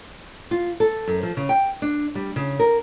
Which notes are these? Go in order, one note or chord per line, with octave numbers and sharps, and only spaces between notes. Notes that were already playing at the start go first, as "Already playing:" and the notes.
F4
A4
F#2
F3
C#3
G5
D4
G3
C#3
A#4